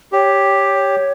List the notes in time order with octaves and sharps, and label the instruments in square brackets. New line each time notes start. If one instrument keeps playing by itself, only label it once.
[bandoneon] G4 [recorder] C#5